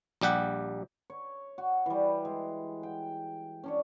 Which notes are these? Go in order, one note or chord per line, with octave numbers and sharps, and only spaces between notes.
A#1 G3 G4 F#5
C#5
F#4
E3 G3
G#3
G5
C#4 D4 C#5